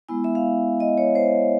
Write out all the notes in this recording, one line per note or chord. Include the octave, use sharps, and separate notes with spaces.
G#3 B3 E4 G#5
E5
F5
D#5
C#5
C5